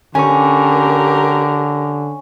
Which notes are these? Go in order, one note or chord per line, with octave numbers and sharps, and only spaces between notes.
D3 C#4 G4 A#4 G#5 C#6